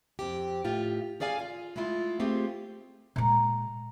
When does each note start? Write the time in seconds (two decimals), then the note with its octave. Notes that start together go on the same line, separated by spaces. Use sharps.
0.19 F2 C4 G4
0.64 A2 F4 G4
1.20 C#4 G#4 D5 F5 G#5
1.39 F4
1.76 G#3 A3 E4 F4
2.20 A3 C4 F4 G4 G#4
3.16 A#2 G#3 A#5